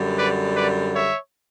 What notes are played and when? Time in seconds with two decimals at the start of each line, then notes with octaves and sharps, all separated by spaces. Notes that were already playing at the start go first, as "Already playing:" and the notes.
Already playing: F#2 D3 G3
0.15 B4 D5
0.55 B4 D5
0.93 C#5 E5